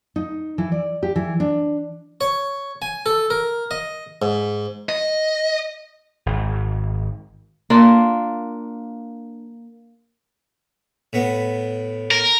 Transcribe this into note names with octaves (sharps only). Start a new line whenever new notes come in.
D#4
E3
D5
G4
E3
D4
C#5
G#5
A4
A#4
D#5
G#2
D#5
G#1
A#3 D4 F4
A2 B3
A#4